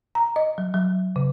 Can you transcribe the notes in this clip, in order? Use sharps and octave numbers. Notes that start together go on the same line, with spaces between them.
A#5
D#5
F#3
F#3
C#3